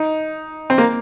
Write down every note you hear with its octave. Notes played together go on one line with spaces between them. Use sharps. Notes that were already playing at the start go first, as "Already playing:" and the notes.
Already playing: D#4
C4
A#3